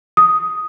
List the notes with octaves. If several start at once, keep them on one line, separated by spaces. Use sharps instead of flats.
D#6